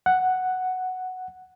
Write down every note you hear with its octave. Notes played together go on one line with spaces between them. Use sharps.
F#5